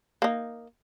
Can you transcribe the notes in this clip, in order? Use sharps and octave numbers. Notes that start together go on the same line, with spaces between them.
A#3 D#4